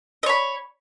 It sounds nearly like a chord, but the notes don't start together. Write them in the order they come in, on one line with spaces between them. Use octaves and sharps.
D#5 C#5 B5